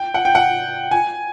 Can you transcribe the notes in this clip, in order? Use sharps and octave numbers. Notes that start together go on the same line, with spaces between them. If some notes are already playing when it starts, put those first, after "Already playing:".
Already playing: G5
F#5
G5
F#5
G#5